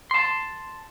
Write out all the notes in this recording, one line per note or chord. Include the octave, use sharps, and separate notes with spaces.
A5 C6